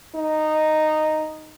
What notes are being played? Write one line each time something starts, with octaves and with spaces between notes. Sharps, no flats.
D#4